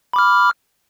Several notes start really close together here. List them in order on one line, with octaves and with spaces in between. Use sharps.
B5 D6 F6